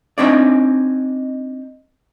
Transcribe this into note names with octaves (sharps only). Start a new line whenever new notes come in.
C4 D4 D#4 C#5 D5